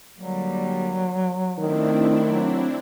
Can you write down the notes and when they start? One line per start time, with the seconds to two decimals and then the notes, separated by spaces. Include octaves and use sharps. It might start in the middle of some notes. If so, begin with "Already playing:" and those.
0.19 D3 F#3 G3 A#3
1.58 D#3 A3 C4 D4 E4
2.26 F#3